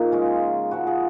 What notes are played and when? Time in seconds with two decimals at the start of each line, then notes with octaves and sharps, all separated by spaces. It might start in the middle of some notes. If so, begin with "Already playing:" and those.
Already playing: F3 A#3 D#4 G#4 A#4
0.12 C#3 G#3 C#4 F4
0.71 C#3 F3 G#3 F#4
0.87 G#4